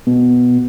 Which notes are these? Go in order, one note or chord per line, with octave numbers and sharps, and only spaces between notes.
B2